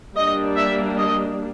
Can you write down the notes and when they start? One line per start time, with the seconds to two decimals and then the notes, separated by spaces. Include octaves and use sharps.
0.16 G3 A#3 D4 D#5
0.56 E5
0.97 D#5